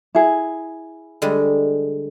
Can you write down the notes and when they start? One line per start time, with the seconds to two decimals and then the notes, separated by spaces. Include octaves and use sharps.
0.15 E4 G#4
1.22 D3 G3 G#3